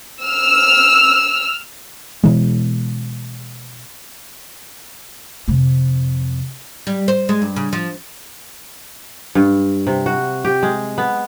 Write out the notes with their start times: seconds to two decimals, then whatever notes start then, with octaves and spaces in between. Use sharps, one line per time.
0.22 E6 F6
2.24 B2 E3 G#3
5.48 F2 C3
6.87 G3
7.08 C5
7.29 G#3
7.42 G2
7.56 C#3
7.73 F3
9.35 G2
9.87 C3
10.06 F#4
10.45 G4
10.63 G#3
10.98 B3